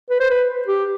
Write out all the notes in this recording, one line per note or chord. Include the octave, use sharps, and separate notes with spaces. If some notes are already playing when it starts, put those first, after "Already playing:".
B4
C5
B4
G4